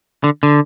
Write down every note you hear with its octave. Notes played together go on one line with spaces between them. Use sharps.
D3
D3